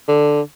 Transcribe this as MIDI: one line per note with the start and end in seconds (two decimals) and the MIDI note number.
0.08 0.41 50